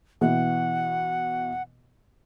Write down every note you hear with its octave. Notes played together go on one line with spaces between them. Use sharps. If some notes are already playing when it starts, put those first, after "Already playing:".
B2 E3 F#5